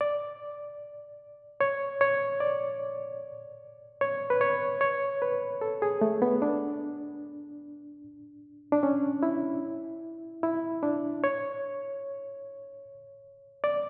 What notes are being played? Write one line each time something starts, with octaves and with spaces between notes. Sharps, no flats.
D5
C#5
C#5
D5
C#5
B4
C#5
C#5
B4
A4
G#4
A3
B3
D4
D4
C#4
E4
E4
D4
C#5
D5